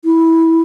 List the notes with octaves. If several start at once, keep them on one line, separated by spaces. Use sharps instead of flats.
E4